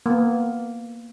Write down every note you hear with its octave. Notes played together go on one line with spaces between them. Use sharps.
A#3 B3